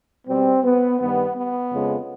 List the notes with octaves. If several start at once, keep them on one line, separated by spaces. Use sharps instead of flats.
B2 G3 C4
B3
G2 D#3 G3 B3
B3
F2 C#3 F3 G#3